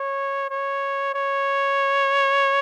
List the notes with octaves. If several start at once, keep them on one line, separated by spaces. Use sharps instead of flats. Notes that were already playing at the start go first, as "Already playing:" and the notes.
Already playing: C#5
C#5
C#5